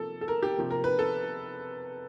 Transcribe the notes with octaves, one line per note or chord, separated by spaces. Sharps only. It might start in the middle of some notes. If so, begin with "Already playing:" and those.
Already playing: C3 F3 A#3 A4
A4
A#4
G4
C3 F3 A#3
A#4
B4
A4